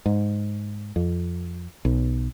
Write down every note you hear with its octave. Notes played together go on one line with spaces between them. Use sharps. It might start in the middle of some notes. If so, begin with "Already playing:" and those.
G#2
F2
B1